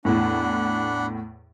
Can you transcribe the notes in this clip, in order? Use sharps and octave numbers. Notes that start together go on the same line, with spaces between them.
E2 A2 D4 F#5 B5